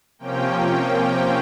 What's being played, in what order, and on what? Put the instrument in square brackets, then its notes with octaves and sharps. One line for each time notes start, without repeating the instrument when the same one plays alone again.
[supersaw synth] C3 F3 A#3 C#4 G5